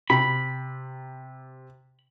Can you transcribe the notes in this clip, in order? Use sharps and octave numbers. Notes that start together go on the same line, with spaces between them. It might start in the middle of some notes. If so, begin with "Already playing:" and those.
C3 B5